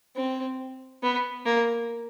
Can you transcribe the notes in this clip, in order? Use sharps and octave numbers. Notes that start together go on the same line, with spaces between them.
C4
B3
A#3